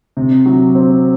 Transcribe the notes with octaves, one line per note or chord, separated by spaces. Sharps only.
C3
F#3
C4